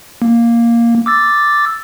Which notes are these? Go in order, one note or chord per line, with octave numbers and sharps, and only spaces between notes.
A#3
D6 E6 A6